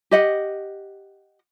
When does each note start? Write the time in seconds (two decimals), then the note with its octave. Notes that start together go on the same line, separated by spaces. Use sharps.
0.11 G4 D#5 F#5